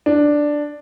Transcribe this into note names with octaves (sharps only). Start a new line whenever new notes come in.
D4